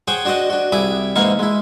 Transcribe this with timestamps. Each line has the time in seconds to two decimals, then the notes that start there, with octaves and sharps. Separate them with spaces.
0.08 G#4 C5 C#5 F#5 G5
0.25 D4 F#4 C5 D5 D#5
0.50 D4 F#4
0.72 C2 E4 G#4 B5 D6
1.16 G#2 E3 A#3 D#4 F5 C#6
1.39 G#3 E4